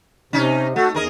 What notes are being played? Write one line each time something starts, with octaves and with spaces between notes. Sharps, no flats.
C3 C#4 D#4
A3 F#4 A4 F#5
E2 G#4 A#4 D#5